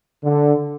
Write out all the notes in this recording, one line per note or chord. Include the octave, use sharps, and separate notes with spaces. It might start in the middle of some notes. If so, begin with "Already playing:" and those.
D3